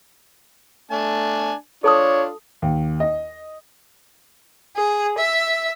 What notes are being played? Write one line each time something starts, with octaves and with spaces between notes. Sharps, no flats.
A3 D4 G#5 A5
D4 F4 A4 C#5 A5 D#6
D#2
D#5
G#4
E5